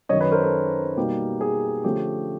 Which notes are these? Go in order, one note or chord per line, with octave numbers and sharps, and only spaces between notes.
F#2 D#3 F#3 C#5 D#5
B4 C#5
A#4 C5
A4 B4
B2 G3 A#3 D#4 G4
G#4
D3 F3 A3 C#4 G4